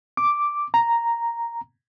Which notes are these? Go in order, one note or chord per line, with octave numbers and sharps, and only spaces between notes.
D6
A#5